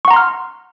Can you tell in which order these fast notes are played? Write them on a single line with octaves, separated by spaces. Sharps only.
C#6 F#5 A#5 C6 F6